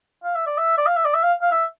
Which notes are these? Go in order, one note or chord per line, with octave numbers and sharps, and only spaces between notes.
F5
E5
D5
E5
D5
F5
E5
D5
E5
F5
F5
E5